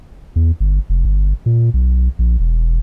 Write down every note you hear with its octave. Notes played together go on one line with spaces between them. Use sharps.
E2
G1
F1
G1
A#2
B1
A#1
E1